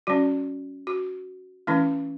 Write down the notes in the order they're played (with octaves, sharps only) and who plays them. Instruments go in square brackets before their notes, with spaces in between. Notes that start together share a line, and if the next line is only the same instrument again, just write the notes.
[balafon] F#3 C#4 F#4
F#4
E3 A3 C#4 E4